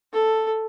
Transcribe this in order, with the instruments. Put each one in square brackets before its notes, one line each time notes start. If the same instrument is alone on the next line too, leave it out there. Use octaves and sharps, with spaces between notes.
[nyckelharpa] A4